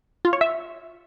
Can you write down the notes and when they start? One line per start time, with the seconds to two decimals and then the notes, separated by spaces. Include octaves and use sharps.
0.25 F4
0.33 C#5
0.41 E5